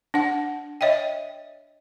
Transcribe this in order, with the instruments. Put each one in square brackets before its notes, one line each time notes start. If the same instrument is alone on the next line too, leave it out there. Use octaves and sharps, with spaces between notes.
[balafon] D4 F#5
C#5 D#5 E5 G5